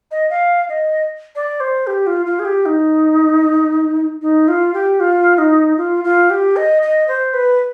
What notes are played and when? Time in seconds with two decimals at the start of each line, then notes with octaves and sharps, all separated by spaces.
0.11 D#5
0.30 F5
0.69 D#5
1.35 D5
1.60 C5
1.87 G4
2.07 F4
2.26 F4
2.39 G#4
2.45 G4
2.66 D#4
4.22 D#4
4.48 F4
4.74 G4
5.00 F4
5.38 D#4
5.77 F4
6.04 F4
6.30 G4
6.56 D#5
6.83 D#5
7.08 C5
7.34 B4